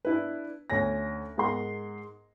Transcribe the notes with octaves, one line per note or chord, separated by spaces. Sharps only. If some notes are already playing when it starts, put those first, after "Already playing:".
D4 E4 B4
D2 C#4 G#5 A#6
G#2 G#4 A#4 F#5 C6